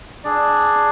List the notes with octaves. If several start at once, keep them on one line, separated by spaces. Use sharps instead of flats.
D4 G#4 D5